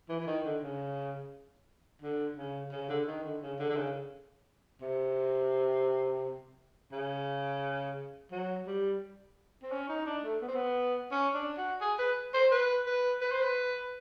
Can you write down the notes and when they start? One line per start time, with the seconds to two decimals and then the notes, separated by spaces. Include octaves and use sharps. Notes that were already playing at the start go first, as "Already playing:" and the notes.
0.09 E3
0.20 E3
0.27 D#3
0.44 D3
0.62 C#3
2.02 D3
2.37 C#3
2.72 C#3
2.89 D3
3.07 D#3
3.24 D3
3.42 C#3
3.59 D3
3.70 D3
3.76 C#3
4.81 C3
6.92 C#3
8.31 F#3
8.67 G3
9.63 C4
9.71 C#4
9.89 D#4
10.06 D4
10.24 A3
10.41 B3
10.48 C4
10.55 B3
11.12 C#4
11.34 D4
11.58 F#4
11.81 G#4
11.99 B4
12.34 C5
12.51 B4
12.86 B4
13.21 B4
13.32 C5
13.42 B4